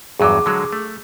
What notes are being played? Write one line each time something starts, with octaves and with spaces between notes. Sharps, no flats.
E2 G2 F#3 G#4 D6
D3 F#3 G#3
A3